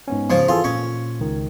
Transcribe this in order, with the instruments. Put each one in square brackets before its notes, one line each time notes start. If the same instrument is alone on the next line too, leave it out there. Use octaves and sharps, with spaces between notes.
[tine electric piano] G#2 B3 C#4
[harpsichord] C#3 F3
[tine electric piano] E3 G#4 A4 [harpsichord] F4
[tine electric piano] A#2 [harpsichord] C#4
[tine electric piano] C#2 D#3